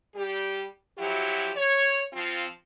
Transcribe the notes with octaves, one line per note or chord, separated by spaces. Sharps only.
G3 G4
F3 F#3 E4 F#4 G4
C#5
F3 C4 F4